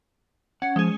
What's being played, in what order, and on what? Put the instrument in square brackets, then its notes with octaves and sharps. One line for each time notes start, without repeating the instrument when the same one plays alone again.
[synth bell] C#4 [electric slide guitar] F#5
[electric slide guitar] F3 [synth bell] G#3 G#4